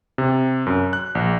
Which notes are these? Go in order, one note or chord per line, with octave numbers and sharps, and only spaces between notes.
C3
F#2
F#6
A#1